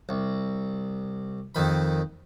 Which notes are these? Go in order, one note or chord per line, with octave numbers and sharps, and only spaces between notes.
C2
F2 D#3 B5